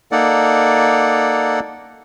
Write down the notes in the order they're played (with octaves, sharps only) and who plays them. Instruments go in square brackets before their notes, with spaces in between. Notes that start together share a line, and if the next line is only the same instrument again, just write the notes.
[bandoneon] A#3 D#4 A4 D5 F#5